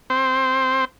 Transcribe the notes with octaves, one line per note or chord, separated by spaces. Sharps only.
C4 C5